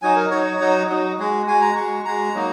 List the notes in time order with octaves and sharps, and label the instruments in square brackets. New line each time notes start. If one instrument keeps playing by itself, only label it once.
[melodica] F#3 D#4 F#4 G#5
A#4
F#3 D#4 F#4 C#5
F#3 D#4 F#4
F#3 D#4 F#4
G#3 F#4
G#3 F#4 G#5
A#5
G#3 C#6
F#4
G#3 F#4 A#5
F#3 A#3 D#4 F#4